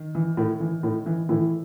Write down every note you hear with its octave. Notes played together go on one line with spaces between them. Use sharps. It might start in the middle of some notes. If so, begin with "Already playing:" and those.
Already playing: D#3
E3
A2
E3
A2
E3
A2 E3 E4